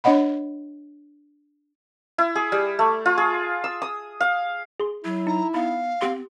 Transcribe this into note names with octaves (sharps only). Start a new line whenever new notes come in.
D4 C#5 D#5 F#5 B5
E4
G#4
G3
A3
F4
G#4
E6
D#6
F5
G#4 C6
F#3 E4
D#4 A#5
B3 D#4 F5 B5
B3 C4 G4 C6